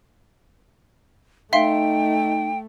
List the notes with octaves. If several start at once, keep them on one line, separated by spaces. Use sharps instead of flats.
A3 D#4 E5 F5 G5 C6